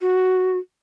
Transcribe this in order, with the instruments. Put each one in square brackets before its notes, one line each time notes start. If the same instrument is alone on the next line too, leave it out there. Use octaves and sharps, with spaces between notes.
[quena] F#4